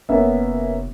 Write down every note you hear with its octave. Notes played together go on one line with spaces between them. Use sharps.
F1 A#3 B3 C#4 E5